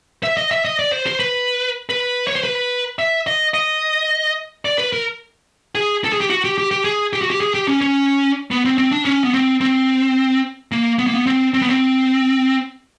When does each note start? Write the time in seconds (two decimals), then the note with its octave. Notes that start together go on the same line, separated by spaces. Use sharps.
0.23 E5
0.37 D#5
0.51 E5
0.65 D#5
0.79 D5
0.92 C5
1.06 C5
1.20 B4
1.89 B4
2.27 C#5
2.35 C5
2.44 B4
2.99 E5
3.27 D#5
3.54 D#5
4.65 D5
4.78 B4
4.93 A#4
5.75 G#4
6.04 A4
6.12 G#4
6.21 G4
6.30 F#4
6.44 G4
6.58 G4
6.71 G4
6.84 G#4
7.13 G4
7.21 F#4
7.30 G4
7.41 G#4
7.54 G4
7.68 C#4
7.81 C#4
8.51 B3
8.65 C4
8.78 C4
8.92 D4
9.05 C#4
9.24 B3
9.34 C4
9.61 C4
10.72 A#3
10.98 B3
11.07 A#3
11.14 B3
11.26 C4
11.54 C4
11.62 B3
11.70 C4